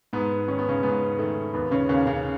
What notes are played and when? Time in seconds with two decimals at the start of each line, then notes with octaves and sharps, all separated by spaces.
0.13 G#2 B3
0.48 D#3 C#4
0.59 B3
0.69 C#3 C#4
0.83 G#2 B3
1.19 D#3 A3
1.54 D#2 B3
1.71 C#3 C#4
1.89 D#2 C#3 C#4
2.07 C#3 C#4